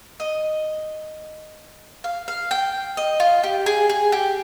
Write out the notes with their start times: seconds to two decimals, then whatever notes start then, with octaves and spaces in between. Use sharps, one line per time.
0.20 D#5
2.04 F5
2.28 F5
2.51 G5
2.97 D#5
3.20 F4
3.44 G4
3.66 G#4
3.89 G#4
4.12 G4